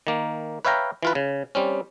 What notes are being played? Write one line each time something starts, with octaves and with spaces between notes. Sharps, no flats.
D#3 A#3
B4 C#5 E5 F5 G5 A#5
E3 F4 B4
C#3
G3 C4 C#4